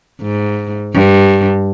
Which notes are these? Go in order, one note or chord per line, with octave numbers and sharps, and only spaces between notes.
G#2
G2